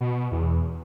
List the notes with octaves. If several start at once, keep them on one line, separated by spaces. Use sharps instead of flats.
B2
E2